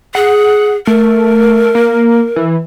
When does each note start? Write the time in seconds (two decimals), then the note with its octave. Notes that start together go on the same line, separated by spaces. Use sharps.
0.15 G#4 F#5
0.87 A3 A#4
1.75 A#3
2.36 E3